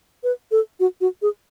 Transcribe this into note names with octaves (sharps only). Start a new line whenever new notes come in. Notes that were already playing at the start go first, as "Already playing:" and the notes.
B4
A4
F#4
F#4
G#4